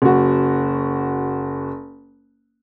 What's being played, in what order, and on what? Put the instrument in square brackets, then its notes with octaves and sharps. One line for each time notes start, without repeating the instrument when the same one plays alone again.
[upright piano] F#1 F#4